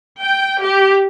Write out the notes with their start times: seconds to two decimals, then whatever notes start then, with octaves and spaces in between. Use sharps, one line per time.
0.20 G5
0.61 G4